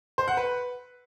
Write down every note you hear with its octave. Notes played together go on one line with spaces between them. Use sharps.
C5
F#5
B4